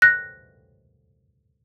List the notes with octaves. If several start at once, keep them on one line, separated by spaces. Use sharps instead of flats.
F#6 A#6